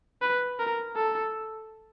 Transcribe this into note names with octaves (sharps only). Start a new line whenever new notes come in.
B4
A#4
A4